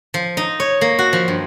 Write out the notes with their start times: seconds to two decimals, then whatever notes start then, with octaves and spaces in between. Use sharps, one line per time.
0.14 F3
0.37 D#4
0.60 C#5
0.81 A#3
0.99 F#4
1.13 F3
1.28 G2